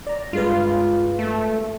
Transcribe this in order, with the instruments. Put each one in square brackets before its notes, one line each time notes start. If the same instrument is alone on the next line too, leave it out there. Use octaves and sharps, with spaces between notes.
[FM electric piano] D5 A#5
[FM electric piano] G2 G#3 B4 [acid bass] F4
[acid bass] A3